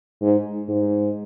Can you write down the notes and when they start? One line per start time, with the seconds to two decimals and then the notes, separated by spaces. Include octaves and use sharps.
0.22 G#2
0.69 G#2